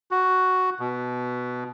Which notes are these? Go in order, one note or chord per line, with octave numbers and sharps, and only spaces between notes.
F#4
B2